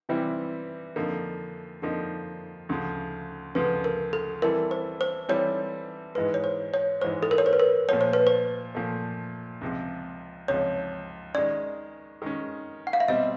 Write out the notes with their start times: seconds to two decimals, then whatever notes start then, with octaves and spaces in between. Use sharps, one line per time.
0.09 C3 E3 G3 C4 E4
0.96 F2 D3 F3 A#3 D#4
1.82 F2 D3 F3 A#3 D#4
2.69 D2 C#3 F3
3.55 D2 C#3 F3 B4
3.84 A#4
4.13 A4
4.42 E3 G3 C4 E4 A4 A#4
4.71 C5
5.01 C5
5.29 E3 G3 C4 E4 A4 C#5
6.15 G#2 E3 G#3 B4
6.34 C#5
6.44 C5
6.74 C#5
7.02 G#2 E3 G#3 C5
7.23 A4
7.31 A#4
7.38 C#5
7.46 C5
7.53 B4
7.60 A#4
7.88 A#2 F3 A3 C#5
8.01 C5
8.13 B4
8.27 C5
8.75 A#2 F3 A3
9.61 C#2 C3 F3
10.48 C#2 C3 F3 C#5
11.35 D#3 G#3 C#4 D5
12.22 D#3 G#3 C#4
12.87 F#5
12.93 F5
13.00 E5
13.08 B2 G3 C4 D#5